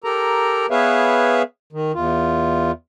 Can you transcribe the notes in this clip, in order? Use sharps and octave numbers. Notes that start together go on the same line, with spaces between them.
G4 A4 A#4 A#5
B3 G#4 B4 C#5 E5 F5
D#3
E2 F4